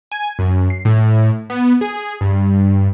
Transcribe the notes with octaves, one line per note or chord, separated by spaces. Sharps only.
G#5
F#2
C7
A2
B3
G#4
G2